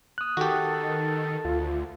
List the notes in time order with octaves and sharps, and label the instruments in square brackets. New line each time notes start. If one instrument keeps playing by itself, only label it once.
[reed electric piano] D#6 F#6
[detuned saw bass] D#3 [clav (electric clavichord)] F#4 G4 [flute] A4
[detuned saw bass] D2 [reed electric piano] F4